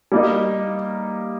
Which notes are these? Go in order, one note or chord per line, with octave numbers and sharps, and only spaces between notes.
G3 A#3 D#4